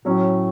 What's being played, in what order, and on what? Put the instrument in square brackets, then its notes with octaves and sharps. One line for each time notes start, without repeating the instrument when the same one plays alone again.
[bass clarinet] A2 [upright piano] F#3 C#4